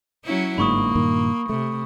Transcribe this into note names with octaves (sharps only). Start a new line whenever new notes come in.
F#3 C#4 E4
G1 G#2 A#3 D4 B5 C#6 D#6
G2 A#2 D#3
C3 A3